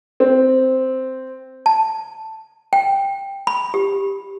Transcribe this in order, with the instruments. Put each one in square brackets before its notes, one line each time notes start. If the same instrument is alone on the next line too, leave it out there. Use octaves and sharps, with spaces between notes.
[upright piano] C4
[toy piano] A5
G5
B5
G4